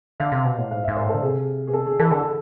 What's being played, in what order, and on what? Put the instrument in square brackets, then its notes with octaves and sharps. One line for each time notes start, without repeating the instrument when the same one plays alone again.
[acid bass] D3 [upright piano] F5
[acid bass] C3
B2
A2
[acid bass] G#2 [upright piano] F5
[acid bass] G#2 [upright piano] E5
[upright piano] C5
[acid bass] A2 [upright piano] A4
[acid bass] D3
[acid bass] C3 [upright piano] G#4
[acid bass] B2 [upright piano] G#4
[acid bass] C3 [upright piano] A4
[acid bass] D3 [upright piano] G#4
[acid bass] E3 [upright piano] A4
[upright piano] G#4
[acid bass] D3 [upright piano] A4